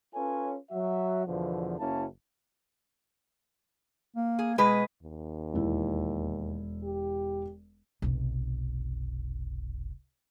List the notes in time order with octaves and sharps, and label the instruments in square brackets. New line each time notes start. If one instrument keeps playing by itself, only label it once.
[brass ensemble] C#4 F4 A4 B4 C#5 G#5
F#3 F#4 E5
E2 B2 D3 F3
F#1 F#3 A#3 C#4 E4 A5
[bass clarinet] A#3
[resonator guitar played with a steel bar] G#4
[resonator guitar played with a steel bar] B2 G#4 B4 [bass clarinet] G#3
[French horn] D#2
[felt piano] E1 E4
[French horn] G4
[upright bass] F1 B1